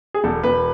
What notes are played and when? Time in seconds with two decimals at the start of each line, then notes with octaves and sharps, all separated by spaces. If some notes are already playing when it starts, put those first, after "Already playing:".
0.14 G#4
0.24 E1 A4
0.43 E1 B4